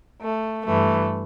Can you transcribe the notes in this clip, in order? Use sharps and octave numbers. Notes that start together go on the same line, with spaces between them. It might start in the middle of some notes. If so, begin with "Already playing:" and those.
A3
G2 E3 A3